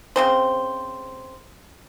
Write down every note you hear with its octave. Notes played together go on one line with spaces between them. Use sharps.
C#3 C4 C5